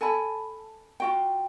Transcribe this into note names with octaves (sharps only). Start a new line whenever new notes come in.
A4 G#5 A5 B5
F4 F#4 G5